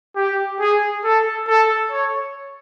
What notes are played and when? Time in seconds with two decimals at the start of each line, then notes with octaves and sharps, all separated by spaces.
0.16 G4
0.60 G#4
1.04 A4
1.48 A4
1.92 C#5